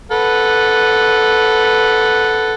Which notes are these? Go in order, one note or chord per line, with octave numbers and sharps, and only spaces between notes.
A4 B4 F#5